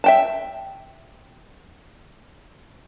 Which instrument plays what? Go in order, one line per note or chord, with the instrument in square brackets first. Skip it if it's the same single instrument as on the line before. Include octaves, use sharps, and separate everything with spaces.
[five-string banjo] E5 G5 A5